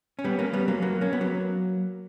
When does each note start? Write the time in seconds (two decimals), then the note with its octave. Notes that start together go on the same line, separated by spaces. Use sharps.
0.19 C#4
0.24 G3 B3
0.39 A#3 C#4
0.53 G3 B3
0.68 F#3 A#3
0.82 F#3 A#3
1.01 A#3 C#4
1.13 B3
1.21 F#3 A#3